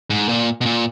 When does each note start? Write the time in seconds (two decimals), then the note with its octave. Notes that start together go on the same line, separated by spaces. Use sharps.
0.10 G#2
0.29 A#2
0.61 B2
0.66 A#2